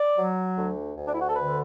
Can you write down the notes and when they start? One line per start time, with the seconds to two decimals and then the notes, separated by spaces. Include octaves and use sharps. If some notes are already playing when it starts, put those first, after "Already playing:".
Already playing: D5
0.18 F#3
0.57 D2
0.97 D2
1.06 D4
1.13 E4
1.21 F#4
1.28 A4
1.36 D3 B4